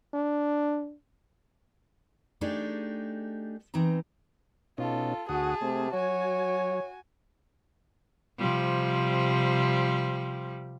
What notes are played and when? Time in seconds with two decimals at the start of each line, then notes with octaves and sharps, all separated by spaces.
0.14 D4
2.41 A3 D4 D#4 G4 G#4
3.74 E3 C4 D#4 A#5
4.78 B2 C#4 D#4 F4 A4
5.29 D2 F#4 G#4 F#5 A5 D#6
5.62 C3 A3 C4
5.93 F#3 F#4 C#5 G#5
8.38 C3 F3 G3